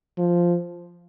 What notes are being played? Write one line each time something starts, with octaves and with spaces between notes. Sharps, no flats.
F3